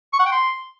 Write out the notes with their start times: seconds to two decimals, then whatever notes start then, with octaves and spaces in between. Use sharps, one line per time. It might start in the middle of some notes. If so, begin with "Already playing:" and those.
0.13 C#6
0.19 F#5
0.26 G5
0.32 C6